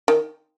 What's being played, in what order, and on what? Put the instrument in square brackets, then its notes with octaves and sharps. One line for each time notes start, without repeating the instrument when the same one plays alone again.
[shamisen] D#3